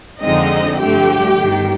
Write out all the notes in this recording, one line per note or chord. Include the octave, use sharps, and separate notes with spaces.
F2 D3 F3 G#3 C4 D#4 D#5
G2 D3 F3 A3 G4 G5
G1 G2 D#3